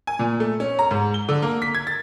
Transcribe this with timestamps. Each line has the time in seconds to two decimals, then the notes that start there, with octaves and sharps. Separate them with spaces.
0.07 G#5
0.19 A#2
0.40 A3
0.60 C#4
0.79 A#5
0.91 G#2
1.14 G7
1.29 D3
1.42 A#3
1.62 B6
1.75 G#6
1.87 A6